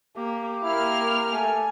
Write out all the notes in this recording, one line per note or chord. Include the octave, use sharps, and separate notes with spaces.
A#3 G4
A#3 E4 F5 F6
A3 G#5